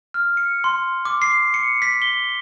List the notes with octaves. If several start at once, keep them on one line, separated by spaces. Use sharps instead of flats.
F6
C#7
C6
D6
C7
C#7
B6
G7